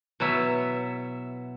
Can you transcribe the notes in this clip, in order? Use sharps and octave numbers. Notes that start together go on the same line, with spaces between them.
B2 F#3 E4 E5